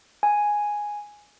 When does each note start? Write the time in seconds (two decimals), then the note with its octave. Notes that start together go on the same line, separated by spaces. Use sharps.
0.23 G#5